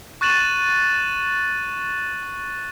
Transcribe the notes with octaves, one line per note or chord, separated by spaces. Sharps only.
C#6 F#6 A6 D#7 E7 F#7